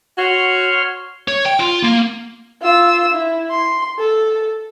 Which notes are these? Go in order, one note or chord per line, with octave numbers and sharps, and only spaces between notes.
F#4 C#5 C6 F6
C#5
G5
F4
A#3
F4 E6
E4
C6
A4